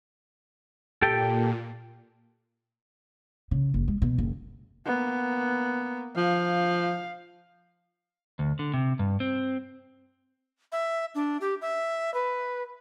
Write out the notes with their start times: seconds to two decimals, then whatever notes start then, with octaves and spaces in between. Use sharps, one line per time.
1.02 A#2 G4 A4 G5
3.51 C#3
3.74 F#1
3.88 G#3
4.02 B2
4.18 F#1
4.86 A#3 B3
6.17 F3 F5
8.39 D2
8.59 D3
8.74 C3
8.99 G2
9.20 C4
10.72 E5
11.15 D4
11.41 G4
11.62 E5
12.14 B4